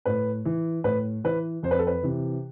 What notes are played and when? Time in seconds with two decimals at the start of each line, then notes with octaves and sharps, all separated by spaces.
0.05 A2 B4
0.45 E3
0.84 A2 B4
1.24 E3 B4
1.63 F2 C5
1.71 B4
1.79 A4
1.87 B4
2.03 C3 E3